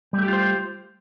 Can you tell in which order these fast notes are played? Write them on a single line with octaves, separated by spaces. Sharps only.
G3 A3 G4 F4 C5